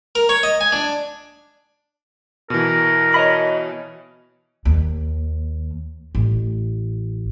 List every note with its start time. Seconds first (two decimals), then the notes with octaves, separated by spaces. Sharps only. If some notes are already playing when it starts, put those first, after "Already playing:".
0.15 A#4
0.29 C#5
0.43 D#5
0.61 G#5
0.72 D4
2.50 B2 E3 A#4
3.14 C#5 D#5 B5
4.65 D#2
6.15 A1